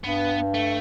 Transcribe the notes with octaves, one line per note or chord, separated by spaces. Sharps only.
G2 B3
A3